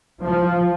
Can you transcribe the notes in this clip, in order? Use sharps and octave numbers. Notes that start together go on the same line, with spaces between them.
F3